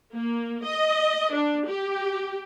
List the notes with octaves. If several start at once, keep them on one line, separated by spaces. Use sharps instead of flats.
A#3
D#5
D4
G4